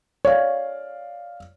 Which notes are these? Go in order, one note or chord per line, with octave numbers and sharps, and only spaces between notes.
C#5 D5 F5